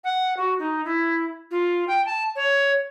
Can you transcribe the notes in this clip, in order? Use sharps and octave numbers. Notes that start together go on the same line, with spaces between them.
F#5
F#4
D#4
E4
F4
G5
A5
C#5